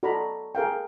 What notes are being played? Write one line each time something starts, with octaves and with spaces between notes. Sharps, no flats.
F#4 A4 D5 D#5 A#5 B5
G#4 A#4 F5 G5